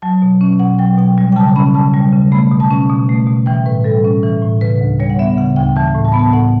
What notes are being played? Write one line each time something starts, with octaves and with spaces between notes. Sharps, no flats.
F#3 A5
B2
C#4
B2 F#5
F#3 G5
B2 G5
G3
G5
C#3 A5
C#4 B5
C#3 A5
G3
C#3
A3 B5
B2
A5
C#4
B2
A3
B2
E3 G5
A2 B4
G3 A4
C#4
E3
A2
C#3 B4
D2
G3 C#5
F#5
B3 E5
C#3 F#5
D2 G5
E3 A5
A2
A5
B3 B5
A5
A2 F#5